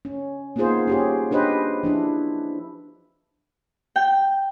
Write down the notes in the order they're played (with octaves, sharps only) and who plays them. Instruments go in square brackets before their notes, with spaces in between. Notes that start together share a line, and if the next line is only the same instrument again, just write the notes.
[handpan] C#4
A#3 B3 D#4 F4 G#4 C5
C#4 G4 G#4
D4 G4 B4 C5 D#5
F3 D4 E4
[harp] G5